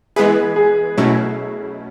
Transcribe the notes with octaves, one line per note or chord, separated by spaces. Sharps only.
E3 G#3 B3 E4 G#4 B4
G#4
B2 F#3 A3 C#4 E4